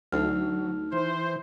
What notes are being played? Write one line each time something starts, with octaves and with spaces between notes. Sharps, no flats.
D2 F#3 D#4 F6
E3 C5